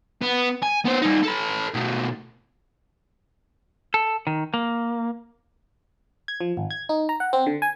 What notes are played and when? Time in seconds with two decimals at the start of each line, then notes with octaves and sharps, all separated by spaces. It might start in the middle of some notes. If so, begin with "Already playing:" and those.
0.22 B3
0.63 G#5
0.85 B3 C5
1.02 G3 D#4
1.23 A4 B4
1.74 B2 A3
3.94 A4
4.27 D#3
4.54 A#3
6.28 G#6
6.41 F3
6.57 G#1
6.71 G#6
6.89 D#4
7.09 A#5
7.20 F#5
7.33 C4
7.46 D3
7.62 G#5